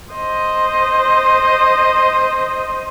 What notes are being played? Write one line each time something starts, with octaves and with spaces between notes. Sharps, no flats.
C5 D#5